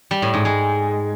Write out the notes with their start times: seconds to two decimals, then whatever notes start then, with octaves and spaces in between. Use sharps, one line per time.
0.11 G3
0.22 A2
0.34 G#2
0.45 G#3